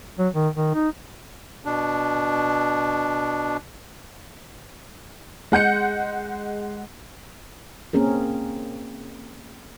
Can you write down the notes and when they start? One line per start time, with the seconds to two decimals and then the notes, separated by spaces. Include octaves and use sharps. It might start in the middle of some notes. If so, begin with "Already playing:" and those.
0.19 F#3
0.34 D#3
0.55 D#3
0.74 D#4
1.65 B2 D4
5.52 G#3 F#5 G6 C#7
7.93 A#3 C4 C#4 G#4 A#4